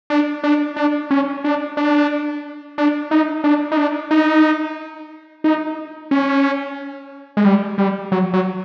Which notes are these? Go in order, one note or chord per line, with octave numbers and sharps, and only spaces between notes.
D4
D4
D4
C#4
D4
D4
D4
D#4
D4
D#4
D4
D#4
D#4
C#4
G#3
G3
G3
F#3
F#3